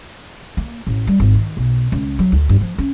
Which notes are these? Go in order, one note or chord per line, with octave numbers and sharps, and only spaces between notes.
A#3
A1
G3
G#1
D#3
B1
C#2
F#3
D2
G2
F3
C#4